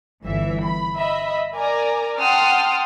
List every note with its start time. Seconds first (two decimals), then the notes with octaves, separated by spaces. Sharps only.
0.24 G1 E3 E5
0.63 B5
0.96 D#5 E5 B5
1.55 A#4 D5 G#5 A#5
2.18 F#5 G5 A5 C6 D#6 F6